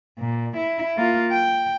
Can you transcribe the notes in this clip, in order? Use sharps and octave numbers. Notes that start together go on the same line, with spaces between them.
A#2
E4
A#3 F4
G5